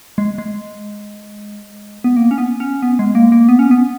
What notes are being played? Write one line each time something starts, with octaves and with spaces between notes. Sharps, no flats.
G#3
G#3
B3
A#3
C#4
B3
C#4
B3
G#3
A#3
A#3
B3
C#4
B3